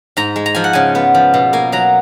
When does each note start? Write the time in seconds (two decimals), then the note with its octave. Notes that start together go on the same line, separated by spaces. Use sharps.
0.17 G#2 A#5
0.36 G#3
0.46 A#5
0.55 F3 G#5
0.64 F#5
0.73 C#3 G#5
0.95 B3
1.15 F3
1.34 B2
1.53 A#3 G#5
1.72 F#3 A#5